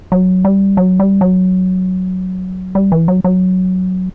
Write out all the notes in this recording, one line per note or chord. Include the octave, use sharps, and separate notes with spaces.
F#3
G3
F#3
G3
F#3
G3
E3
F#3
F#3